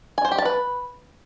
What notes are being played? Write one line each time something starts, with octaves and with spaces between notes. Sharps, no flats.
G#5
C5
G4
A5
B4